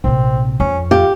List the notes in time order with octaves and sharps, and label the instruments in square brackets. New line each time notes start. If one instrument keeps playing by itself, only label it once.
[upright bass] A#1 C3 [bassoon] C4
[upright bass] F2 [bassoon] C#4
[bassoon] F4 [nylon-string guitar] G4